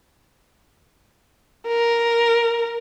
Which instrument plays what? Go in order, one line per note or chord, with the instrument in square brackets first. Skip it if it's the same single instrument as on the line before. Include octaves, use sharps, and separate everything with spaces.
[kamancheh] A#4